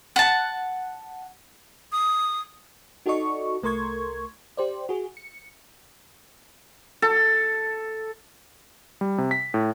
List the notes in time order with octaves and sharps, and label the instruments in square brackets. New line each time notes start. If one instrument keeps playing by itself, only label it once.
[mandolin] F#5 A5
[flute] D#6
[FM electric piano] D#4 F#4 A4 D5 D#5 C#6
C2 A3 A#4 C6 C#6 G#6
G4 C5 D5
F#4 G#4
C#7
[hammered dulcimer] A4
[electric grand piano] G3
C3
B6
A2